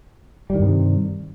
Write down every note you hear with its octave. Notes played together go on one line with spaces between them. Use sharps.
G2 C3 D#3 G3